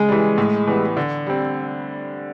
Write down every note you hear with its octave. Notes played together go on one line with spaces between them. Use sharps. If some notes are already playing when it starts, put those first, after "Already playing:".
Already playing: C#3 G#3
E3 G3
A2
E3 G3 B3
D3
G3 C4